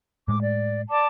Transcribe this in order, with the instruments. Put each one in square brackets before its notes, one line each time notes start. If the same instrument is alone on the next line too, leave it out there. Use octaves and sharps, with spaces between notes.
[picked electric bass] A2 G#3 [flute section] D6
[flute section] D5
D5 A5 D6